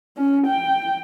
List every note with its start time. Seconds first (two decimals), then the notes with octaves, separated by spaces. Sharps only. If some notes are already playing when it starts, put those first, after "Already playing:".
0.17 C#4
0.47 G5